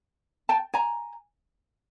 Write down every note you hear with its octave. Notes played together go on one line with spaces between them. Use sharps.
G5 A5
G#5 A#5